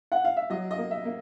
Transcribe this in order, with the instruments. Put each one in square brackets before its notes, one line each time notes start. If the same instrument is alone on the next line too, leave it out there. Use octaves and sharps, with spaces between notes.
[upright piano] F#5
F5
E5
F#3 D#5
D#5
A#3
E5
A#3